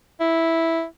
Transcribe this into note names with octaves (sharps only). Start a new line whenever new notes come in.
E4